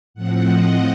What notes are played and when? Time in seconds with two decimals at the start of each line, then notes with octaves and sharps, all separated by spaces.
0.14 A2 F3 C4 F#5
0.44 D#5